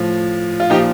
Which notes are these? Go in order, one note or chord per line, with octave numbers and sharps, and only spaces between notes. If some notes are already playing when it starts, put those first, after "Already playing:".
Already playing: A2 F3
F4
A#2 F3 D#4 G4